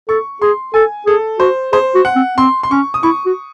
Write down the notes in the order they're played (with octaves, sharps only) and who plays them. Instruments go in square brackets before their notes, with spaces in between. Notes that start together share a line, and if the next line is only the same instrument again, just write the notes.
[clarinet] A4 [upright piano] C#6
[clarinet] G#4 [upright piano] C6
[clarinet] A4 [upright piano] G#5
[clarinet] G#4 [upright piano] A4
[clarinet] F#4 [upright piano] C5
[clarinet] G#4 [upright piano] C5
[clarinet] F#4
[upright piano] F#5
[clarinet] C4
[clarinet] C4 [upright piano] C6
[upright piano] C6
[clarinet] C#4 [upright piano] C#6
[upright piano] D#6
[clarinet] E4 [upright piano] C#6
[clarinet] F#4